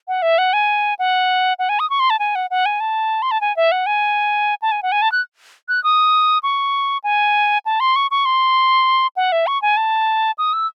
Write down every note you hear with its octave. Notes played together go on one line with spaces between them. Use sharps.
F#5
E5
F#5
G#5
F#5
F#5
G#5
D#6
C#6
C6
A5
G#5
F#5
F#5
G#5
A5
C6
A5
G#5
E5
F#5
G#5
A5
G#5
F#5
G#5
A5
F#6
F#6
D#6
C#6
G#5
A5
C6
C#6
C#6
C6
F#5
E5
C#6
G#5
A5
D#6
E6